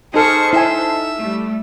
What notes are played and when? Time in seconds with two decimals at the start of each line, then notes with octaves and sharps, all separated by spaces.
0.14 D#4 G#4 A4 C5 C#6 F6
0.53 E4 E5 G#5
1.21 G3 A3